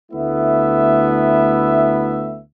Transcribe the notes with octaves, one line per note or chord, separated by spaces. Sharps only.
D2 A3 B3 E4 E5